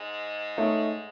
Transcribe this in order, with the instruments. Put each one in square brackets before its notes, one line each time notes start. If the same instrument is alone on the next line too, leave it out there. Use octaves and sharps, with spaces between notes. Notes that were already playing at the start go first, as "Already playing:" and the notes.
Already playing: [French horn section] G#2 G#3
[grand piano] A3 D#4 A4 C#5 E5